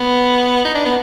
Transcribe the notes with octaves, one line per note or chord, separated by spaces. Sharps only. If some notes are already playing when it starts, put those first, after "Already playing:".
Already playing: B3
D#4
D4
B3